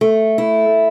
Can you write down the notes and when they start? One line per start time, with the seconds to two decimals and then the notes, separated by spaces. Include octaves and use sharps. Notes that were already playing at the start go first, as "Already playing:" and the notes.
0.01 A3
0.38 E4